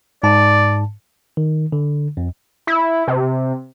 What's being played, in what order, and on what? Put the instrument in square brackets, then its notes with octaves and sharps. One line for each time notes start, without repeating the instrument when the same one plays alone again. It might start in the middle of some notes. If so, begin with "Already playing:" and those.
[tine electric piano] G#2 A5 [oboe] D5
[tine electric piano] D#3
D3
F2
[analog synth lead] E4
C3